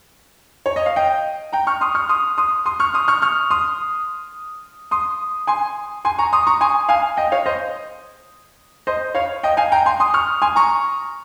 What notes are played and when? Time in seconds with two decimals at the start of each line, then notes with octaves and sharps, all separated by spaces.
0.66 C#5
0.76 D#5
0.86 F5
0.96 D#5 G5
1.53 G5 A#5
1.67 C#6 F6
1.81 C6 D#6
1.95 C#6 F6
2.09 C6 D#6
2.38 C6 D#6
2.66 C6 D#6
2.80 C#6 F6
2.94 C6 D#6
3.08 C#6 F6
3.22 C#6 F6
3.50 C6 D#6
4.91 C6 D#6
5.47 G#5 C6
6.05 G#5 C6
6.19 A#5 C#6
6.33 C6 D#6
6.47 A#5 C#6
6.61 G#5 C6
6.89 F5 G#5
7.17 D#5 G5
7.32 C#5 F5
7.46 C5 D#5
8.87 C5 D#5
9.15 C#5 F5
9.43 D#5 G5
9.57 F5 G#5
9.72 G5 A#5
9.86 G#5 C6
10.00 C6 D#6
10.14 C#6 F6
10.42 G#5 C6
10.56 A#5 C#6